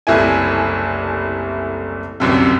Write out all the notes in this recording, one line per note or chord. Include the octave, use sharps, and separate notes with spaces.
F#1 C2 A3 E4 G#5
G1 C2 F#2 C3